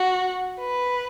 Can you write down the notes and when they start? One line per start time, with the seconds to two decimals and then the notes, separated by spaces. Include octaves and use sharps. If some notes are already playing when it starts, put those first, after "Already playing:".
Already playing: F#4
0.59 B4